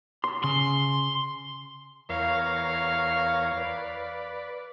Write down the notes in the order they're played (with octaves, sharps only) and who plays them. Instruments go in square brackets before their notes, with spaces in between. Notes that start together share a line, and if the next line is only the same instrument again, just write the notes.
[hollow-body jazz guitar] C6
[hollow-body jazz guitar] C#3 [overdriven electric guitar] C6
[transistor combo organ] E2 A#4 C#5 [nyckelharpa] F5
[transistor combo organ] B4 D5